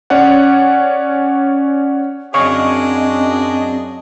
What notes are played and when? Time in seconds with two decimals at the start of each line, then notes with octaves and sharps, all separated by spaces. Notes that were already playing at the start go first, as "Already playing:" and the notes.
0.10 C#4 C#5 D5 F#5
2.34 F#2 C4 D4 G#4 C#5 D#5 F5 C#6